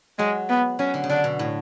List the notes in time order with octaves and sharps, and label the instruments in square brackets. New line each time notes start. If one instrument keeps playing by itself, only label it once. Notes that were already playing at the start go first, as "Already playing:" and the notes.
[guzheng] F#3 [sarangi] G#3
[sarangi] B3
[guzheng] F#3 [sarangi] C#4
[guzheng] D3
C#3
[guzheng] D3 [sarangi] D4
[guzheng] B2
A2